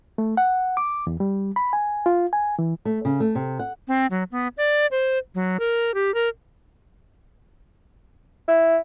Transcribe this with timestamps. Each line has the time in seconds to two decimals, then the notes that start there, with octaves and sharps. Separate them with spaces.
0.18 A3
0.37 F#5
0.77 D6
1.07 E2
1.20 G3
1.56 B5
1.73 G#5
2.06 F4
2.33 G#5
2.59 E3
2.85 A3
3.05 C#3
3.20 A3
3.35 C3
3.59 F#5
3.88 C4
4.11 F#3
4.32 B3
4.57 D5
4.91 C5
5.35 F#3
5.60 A#4
5.94 G4
6.14 A#4
8.48 E4